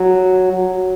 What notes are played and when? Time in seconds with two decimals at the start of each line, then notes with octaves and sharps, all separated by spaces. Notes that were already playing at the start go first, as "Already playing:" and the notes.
Already playing: F#3
0.53 F#3